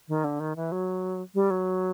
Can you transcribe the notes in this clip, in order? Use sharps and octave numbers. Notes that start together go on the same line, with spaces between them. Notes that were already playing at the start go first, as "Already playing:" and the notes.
D#3
D3
D#3
E3
F#3
G3
F#3